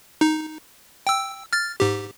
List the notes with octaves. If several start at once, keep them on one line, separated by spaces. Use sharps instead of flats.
D#4
G5 E6
F6 A6
G#2 G4